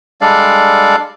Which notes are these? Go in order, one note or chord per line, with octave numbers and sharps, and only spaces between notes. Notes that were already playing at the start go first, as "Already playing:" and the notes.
G3 G#3 D4 A4 D5 F5